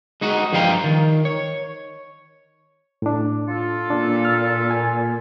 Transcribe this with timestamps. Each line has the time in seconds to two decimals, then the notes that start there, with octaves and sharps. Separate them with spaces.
0.21 G#3 D#4 F#4
0.53 G2 F3 G3 F5 G5 A#5
0.84 D#3
1.25 C#5
3.02 A2 D4
3.48 F4 A4
3.90 A#2 D4
4.25 F6
4.71 G#5